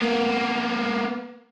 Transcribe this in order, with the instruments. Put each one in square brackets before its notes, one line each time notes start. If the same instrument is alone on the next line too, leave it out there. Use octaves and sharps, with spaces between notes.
[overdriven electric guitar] A#3 B3